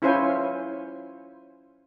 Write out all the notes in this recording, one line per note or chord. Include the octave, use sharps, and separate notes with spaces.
C#4 E4 F4 C5 C#5 G#5